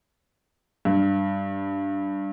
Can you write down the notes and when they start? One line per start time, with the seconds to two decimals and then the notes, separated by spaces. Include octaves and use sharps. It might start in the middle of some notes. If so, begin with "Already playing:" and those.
0.85 G2